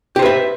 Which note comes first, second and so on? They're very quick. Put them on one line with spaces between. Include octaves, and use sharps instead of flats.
G4 C5 B4 E5